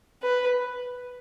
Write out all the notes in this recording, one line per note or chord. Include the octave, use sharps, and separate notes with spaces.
B4